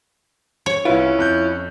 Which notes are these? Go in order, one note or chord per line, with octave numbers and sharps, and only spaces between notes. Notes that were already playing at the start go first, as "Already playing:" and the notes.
C#5
C2 C#4 E4 F4 B4
F2 F#6 G6